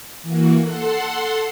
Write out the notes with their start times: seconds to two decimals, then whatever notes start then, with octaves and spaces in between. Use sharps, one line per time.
0.22 E3 A#3 F#4
0.61 A4 F#5 C6